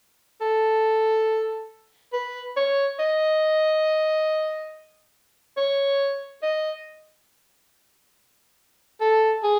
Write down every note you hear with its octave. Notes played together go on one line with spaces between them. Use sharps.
A4
B4
C#5
D#5
C#5
D#5
A4
G#4